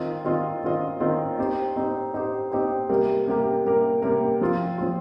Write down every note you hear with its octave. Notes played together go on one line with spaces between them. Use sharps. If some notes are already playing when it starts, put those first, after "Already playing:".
Already playing: D#3 C4 F4 D#5
D#3 C4 F4 D#5
D#3 C4 F4 D#5
D#3 C4 F4 D#5
C4 D#4 G4 C5
C4 D#4 G4 C5
C4 D#4 G4 C5
C4 D#4 G4 C5
C3 G3 A#3 G4 A#4
C3 G3 A#3 G4 A#4
C3 G3 A#3 G4 A#4
C3 G3 A#3 G4 A#4
F3 C4 F4
F3 C4 F4